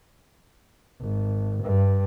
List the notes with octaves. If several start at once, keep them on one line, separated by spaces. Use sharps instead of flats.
G#1
G2